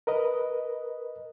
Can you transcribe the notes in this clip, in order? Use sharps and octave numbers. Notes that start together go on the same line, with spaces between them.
A#4 B4 D#5